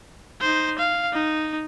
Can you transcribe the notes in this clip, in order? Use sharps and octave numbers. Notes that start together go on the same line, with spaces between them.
D#4 C5
F5
D#4